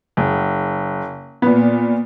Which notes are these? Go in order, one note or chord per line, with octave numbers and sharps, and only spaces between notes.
F#1
A#2 B3